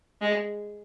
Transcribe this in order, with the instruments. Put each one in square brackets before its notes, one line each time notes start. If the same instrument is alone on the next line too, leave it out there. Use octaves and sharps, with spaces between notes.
[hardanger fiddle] G#3